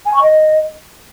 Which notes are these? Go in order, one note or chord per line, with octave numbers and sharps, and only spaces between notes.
G#5
C#6
D#5